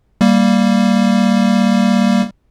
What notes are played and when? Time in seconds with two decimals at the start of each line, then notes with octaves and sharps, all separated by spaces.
0.21 G3 A#3